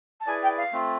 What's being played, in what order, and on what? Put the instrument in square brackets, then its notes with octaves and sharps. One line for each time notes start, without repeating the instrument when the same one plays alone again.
[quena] A5
[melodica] E4 G#4 B4 D5 [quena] G#5
[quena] G5
F5
[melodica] A3 C4 F4